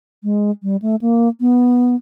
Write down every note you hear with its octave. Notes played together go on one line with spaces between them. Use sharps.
G#3
G3
A3
A#3
B3